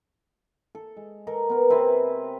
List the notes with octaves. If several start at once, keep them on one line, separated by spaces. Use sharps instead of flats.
A4
G#3
A4 A#4 D#5
B3 A#4
C3 C4 B4 G#5